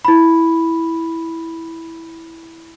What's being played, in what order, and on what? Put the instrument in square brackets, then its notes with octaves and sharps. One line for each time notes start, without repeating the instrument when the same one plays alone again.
[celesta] E4 B5